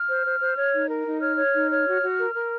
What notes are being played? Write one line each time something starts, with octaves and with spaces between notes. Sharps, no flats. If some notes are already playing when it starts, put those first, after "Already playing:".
Already playing: F6
C5
C5
C5
C#5
D#4
A#4
D#4
C#5 F6
C#5
D#4
C#5
F#4
F#4
A#4
A#4